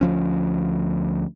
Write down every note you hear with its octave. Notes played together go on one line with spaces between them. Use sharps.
D2 F3 C#4